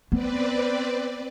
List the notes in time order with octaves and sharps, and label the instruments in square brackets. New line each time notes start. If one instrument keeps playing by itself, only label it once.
[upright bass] B3 [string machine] C4 B4 D5